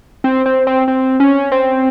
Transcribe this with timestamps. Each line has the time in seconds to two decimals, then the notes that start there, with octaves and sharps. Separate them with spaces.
0.24 C4
0.46 C4
0.67 C4
0.88 C4
1.20 C#4
1.52 C4